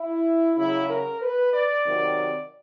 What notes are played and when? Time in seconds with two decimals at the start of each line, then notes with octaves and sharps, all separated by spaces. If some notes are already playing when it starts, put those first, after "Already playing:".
Already playing: E4
0.56 C#3 F#3 E4
0.89 A#4
1.22 B4
1.53 D5
1.85 C3 D#3 F#3